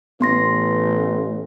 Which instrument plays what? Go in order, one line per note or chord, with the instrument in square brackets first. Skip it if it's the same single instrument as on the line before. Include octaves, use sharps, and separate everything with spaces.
[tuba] A1 [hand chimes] B3 C6 A#6